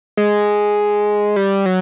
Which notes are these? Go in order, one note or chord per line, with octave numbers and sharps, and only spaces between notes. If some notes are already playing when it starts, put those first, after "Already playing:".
G#3
G3
F#3